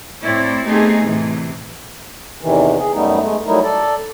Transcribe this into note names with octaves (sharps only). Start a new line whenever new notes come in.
A2 A3 C4 E4 C#5 D5
A3 B3 C4 D#4 G4 G#4
A2 C3 E3
E2 C3 D#3 E3
G#4
F#2 G3 A3 B3 D#4
G#3 A3
F#3 G3 A3 D#4 E4 A#4
A4 D5